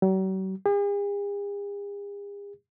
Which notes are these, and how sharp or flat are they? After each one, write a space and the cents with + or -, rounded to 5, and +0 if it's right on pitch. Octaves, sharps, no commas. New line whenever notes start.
F#3 +45
G#4 -45